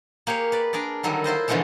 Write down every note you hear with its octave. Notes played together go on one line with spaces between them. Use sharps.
A#3 G4 G#4 C#5
B4 D5
D4 G#4 A#4 D5
D3 D#3 F#3 G3 E4
E4 F4 C5 D#5
B2 D3 E3 F3 G#3 A3